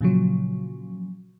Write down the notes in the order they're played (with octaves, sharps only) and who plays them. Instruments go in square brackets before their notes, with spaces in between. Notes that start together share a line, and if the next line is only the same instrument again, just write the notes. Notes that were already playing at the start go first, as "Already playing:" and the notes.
[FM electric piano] A#2 C#3 F3 F#3